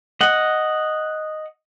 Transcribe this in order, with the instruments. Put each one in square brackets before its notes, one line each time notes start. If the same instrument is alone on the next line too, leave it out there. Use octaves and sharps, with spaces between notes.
[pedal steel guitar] D#5 F#5